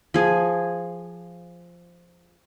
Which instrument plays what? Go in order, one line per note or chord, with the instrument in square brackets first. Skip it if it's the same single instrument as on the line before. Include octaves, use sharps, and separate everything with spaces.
[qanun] F3 G#4